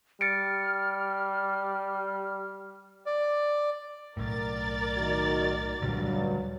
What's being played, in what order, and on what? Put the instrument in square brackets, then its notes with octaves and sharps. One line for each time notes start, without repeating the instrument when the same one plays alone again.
[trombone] G3 [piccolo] F6 [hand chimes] A6 C#7 D7
[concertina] D5
[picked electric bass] B1 A2 [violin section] A#4 D5 A6
[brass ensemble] D#3 F#4
[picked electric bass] D2 A#2 G3 [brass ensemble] G2 F#3